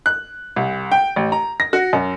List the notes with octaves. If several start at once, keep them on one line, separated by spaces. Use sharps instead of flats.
F#6
C2
G5
A1
A#5
A#6
F#4
F#2